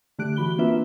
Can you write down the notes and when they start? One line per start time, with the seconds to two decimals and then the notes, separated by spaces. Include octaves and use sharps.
0.19 D3 A3 G4 F#6 D7
0.36 E3 F#4 B5 G7
0.58 A#3 C4 D4 F4 B4 E5